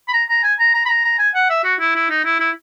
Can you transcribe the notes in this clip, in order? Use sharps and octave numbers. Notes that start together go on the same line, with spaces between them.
B5
A#5
A#5
G#5
A#5
A#5
B5
A#5
A#5
G#5
F#5
E5
F#4
E4
E4
D#4
E4
E4